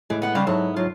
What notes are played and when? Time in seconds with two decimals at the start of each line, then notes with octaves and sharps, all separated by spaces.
0.10 A2 E3 G#3
0.22 B3 F#5
0.35 C#3 G3 C5 F5
0.47 G#2 F#3 B3 E4 A4 A5
0.76 F#3 F4